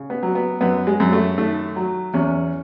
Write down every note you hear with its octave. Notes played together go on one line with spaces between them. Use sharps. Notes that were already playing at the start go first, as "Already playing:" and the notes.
Already playing: C#3
B3
F#3
B3
F#2 B3
G#3
F#2
A3
D#3 A3
F#3
E2 C#4